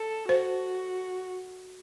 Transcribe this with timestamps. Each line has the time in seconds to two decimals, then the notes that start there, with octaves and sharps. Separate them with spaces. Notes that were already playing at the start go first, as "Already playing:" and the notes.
Already playing: A4
0.29 F#4 C5